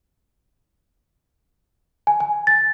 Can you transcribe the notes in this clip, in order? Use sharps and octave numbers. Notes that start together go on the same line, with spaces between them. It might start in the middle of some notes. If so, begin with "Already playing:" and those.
G#5
G#5
A6